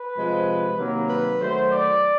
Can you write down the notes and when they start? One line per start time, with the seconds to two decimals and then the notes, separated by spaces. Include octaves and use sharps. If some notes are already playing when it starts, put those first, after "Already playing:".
Already playing: B4
0.17 C3 F3 G#3
0.79 C3 D#3 F#3 A#3
1.10 B4
1.40 D#3 F#3 A3 C5
1.71 D5